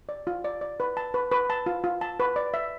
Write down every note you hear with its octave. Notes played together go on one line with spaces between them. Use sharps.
D5
F4
D5
D5
B4
A5
B4
B4
A5
F4
F4
A5
B4
D5
E5